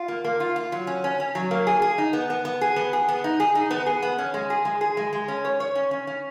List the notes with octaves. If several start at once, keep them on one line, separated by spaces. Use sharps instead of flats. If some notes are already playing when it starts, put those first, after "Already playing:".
Already playing: F4
A#3
A#3
F4
F4
F#3
C#4
C#4
C#4
F#3
A#3
G#4
G#4
D#4
B3
B3
B3
G#4
B3
G#4
B3
D#4
G#4
D#4
B3
G#4
B3
C#4
G#3
G#4
G#3
G#4
G#3
G#3
C#4
C#5
C#5
C#4
C#4
C#4